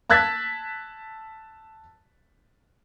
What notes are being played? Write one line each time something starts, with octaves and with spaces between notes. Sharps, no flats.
A5 E6 F#6 G#6 A6 B6